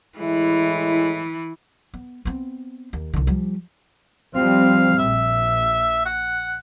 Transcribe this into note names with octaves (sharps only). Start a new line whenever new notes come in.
A2 E3 G#3 E4
B3
B3 C4
D#2
C2 D3
F3 G3
F3 G3 C4 F5
A#1 E5
F#5